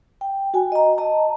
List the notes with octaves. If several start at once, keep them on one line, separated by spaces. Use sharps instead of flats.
G5
F#4 G5 G#5
D#5 A#5
D#5 A5 A#5